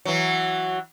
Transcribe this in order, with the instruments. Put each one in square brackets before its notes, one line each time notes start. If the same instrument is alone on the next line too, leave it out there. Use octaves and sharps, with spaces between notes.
[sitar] E3 F#3